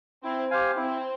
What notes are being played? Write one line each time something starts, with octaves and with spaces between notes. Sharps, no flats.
C4 E4
G4 C5 F5 G#5
C4 E4